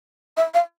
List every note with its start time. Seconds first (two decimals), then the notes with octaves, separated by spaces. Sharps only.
0.37 E5
0.54 F5